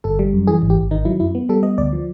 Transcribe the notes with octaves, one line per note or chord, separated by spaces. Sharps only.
G1 A4
G3
F#2
E3 G#4
G#1
G4
G#1
D#3 D#4
F#3 E4
F#2 E4
B3
G3 A4
B3 D#5
D2 D5
F3